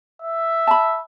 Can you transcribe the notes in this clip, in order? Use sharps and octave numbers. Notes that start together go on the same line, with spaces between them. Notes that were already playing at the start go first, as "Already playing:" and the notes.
E5
A5 B5